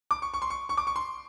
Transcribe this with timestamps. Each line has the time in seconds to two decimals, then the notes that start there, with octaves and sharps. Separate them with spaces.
0.11 D6
0.22 C#6
0.34 C#6
0.42 C6
0.50 C#6
0.69 C#6
0.77 D6
0.87 C#6
0.96 C6